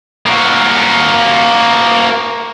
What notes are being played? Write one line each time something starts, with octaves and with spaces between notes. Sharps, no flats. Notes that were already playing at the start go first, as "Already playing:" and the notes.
A#3 F#4